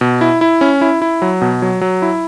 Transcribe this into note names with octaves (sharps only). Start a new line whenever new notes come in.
B2
E4
E4
C#4
E4
E4
F#3
B2
F#3
F#3
E4